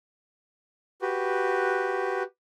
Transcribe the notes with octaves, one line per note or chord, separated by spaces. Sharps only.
F#4 G4 B4